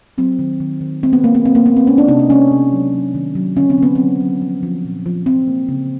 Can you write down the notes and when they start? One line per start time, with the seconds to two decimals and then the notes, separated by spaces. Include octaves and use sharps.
0.18 F#3 C4
0.39 D#3
0.60 D#3
0.81 D#3
1.03 G#3 C4
1.13 B3
1.23 G#3 A#3
1.35 B3
1.45 B2 C4
1.55 A#3
1.66 G#3 B3
1.76 C4
1.87 G#3 C#4
1.98 D4
2.08 C3 D#4
2.19 D4
2.30 G#3 C#4
2.51 C3
2.73 F#3
2.93 F#3
3.15 D#3
3.35 F#3
3.57 D3 C#4
3.70 C4
3.78 D3 B3
3.95 F#3 C4
4.21 F#3
4.42 F3
4.63 F3
4.85 A#2
5.06 F3
5.26 F3 C4
5.48 A#3
5.69 C#3